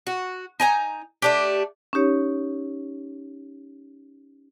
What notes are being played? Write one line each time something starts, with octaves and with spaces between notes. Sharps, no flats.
F#4
D#4 G#5 A#5
A3 D4 G4
C#4 D#4 G4 C#5